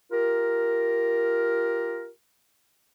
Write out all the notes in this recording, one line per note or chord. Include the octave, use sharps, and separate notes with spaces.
F4 G4 A#4